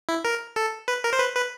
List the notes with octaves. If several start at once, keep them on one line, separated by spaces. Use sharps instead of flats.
E4
A#4
A4
B4
A#4
C5
B4
B4